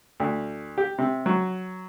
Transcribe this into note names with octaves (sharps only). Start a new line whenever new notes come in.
D2
G4
C3
F#3